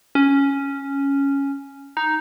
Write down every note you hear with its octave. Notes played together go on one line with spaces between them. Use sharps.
C#4
D#4